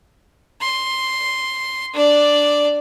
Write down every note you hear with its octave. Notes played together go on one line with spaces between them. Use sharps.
C6
D4 D5